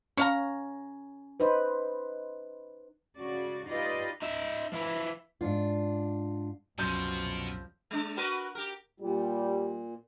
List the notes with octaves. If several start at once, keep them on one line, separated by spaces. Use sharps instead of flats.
C#4 C#5 F5 A#5
D#4 B4 C5
C#3 F#4 D5
D#4 F4 G4 B4 D5 D#5
D#4 E5
F3 E4 B4
G#2 D4 F4
C2 F#2 B2 F3 C6 G6
G#3 D4
F#4 A#4 B4
G4 A#4
A#2 G3